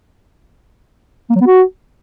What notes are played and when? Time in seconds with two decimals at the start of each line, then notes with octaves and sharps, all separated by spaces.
1.30 A#3
1.36 F#3
1.41 B3
1.46 F#4